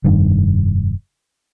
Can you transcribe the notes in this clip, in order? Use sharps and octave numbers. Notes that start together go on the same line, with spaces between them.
F1 G2 D#3